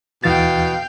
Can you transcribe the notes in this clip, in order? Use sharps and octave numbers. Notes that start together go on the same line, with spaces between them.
D#2 B2 E3 F5 G5 A6